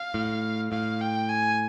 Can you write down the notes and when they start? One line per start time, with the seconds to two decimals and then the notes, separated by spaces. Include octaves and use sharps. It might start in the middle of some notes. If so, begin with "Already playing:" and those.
Already playing: F5
0.14 A2
0.72 A2 F5
1.01 G5
1.29 G#5